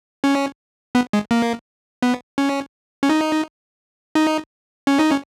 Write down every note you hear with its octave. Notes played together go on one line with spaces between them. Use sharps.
C#4
B3
G#3
A#3
B3
C#4
C#4
D#4
D#4
C#4
D#4
C#4